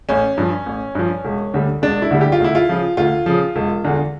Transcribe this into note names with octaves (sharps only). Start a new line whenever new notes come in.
A1 C#4
G2 F3
A1
G2 F3
E1
D2 D3 G3
E1 D4
E4
D2 D3 G3
G4
F4
D2 E4
F4
C#3 F3
D2 F4
C#3 F3
E1
E2 D3